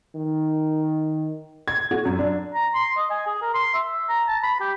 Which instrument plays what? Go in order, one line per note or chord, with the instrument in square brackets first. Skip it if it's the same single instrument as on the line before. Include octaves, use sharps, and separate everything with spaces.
[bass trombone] D#3
[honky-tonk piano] G#6
F#4
F#2
D4
[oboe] A#5
C6
D#5
G#5
G#4
A#4
C6
E5
A#5
A5
B5
G4